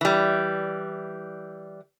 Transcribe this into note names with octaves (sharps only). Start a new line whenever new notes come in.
E3 G3